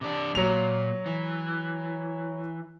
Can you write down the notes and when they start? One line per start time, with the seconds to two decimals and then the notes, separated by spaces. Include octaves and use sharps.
0.01 C3 D4
0.35 A#2 F#3 F7
1.06 E3